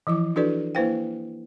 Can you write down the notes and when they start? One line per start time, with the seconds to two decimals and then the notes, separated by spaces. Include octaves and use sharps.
0.07 E3 F3 E4 D6
0.36 D4 E4 F#4 A4 B4 D5
0.75 A#3 E4 B4 C5 F5 G5